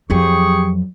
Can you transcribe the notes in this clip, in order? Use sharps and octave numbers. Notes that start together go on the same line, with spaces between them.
F2 F#3 G4 G#4 C#6